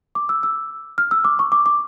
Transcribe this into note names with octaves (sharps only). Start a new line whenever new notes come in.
D6
E6
E6
F6
E6
D6
C#6
D6
D6